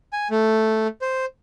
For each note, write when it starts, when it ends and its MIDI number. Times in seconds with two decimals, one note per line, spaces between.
0.13 0.28 80
0.31 0.88 57
1.01 1.25 72